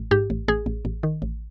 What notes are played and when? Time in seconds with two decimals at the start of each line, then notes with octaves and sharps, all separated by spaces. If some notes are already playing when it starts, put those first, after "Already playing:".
Already playing: A1
0.11 G#2 G4
0.30 A1
0.48 A1 G#4
0.66 A1
0.85 A1
1.03 D#3
1.22 A1